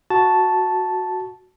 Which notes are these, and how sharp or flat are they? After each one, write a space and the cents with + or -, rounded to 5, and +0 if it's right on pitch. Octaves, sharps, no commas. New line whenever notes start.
F#4 -5 A5 -5